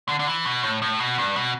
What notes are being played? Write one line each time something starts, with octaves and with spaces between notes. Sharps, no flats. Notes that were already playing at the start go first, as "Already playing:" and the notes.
D3
D3
E3
B2
A2
A2
B2
G2
B2